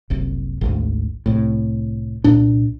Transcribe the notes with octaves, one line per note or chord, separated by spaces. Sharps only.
F#1 C2
G#1 D2
C2 A2
C2 A#2 D4